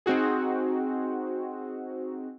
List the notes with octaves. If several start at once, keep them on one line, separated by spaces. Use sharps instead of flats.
C4 D#4 F#4 G#4